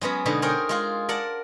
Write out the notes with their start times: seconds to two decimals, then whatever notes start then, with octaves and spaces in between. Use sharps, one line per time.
0.01 F#3 G#3 B3 C#4
0.26 B2 D3 G#3 D#4
0.42 G#4 A#4 C5 C#5 G5
0.69 G#3 F4 G#4
1.09 A#4 D5 F#5 A5